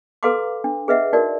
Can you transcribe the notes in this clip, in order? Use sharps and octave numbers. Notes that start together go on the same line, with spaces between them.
A4 B4 F5 A#5 C6 D6
D4
G#4 B4 D#5 E5 F#5
D#4 F#4 A#4 D5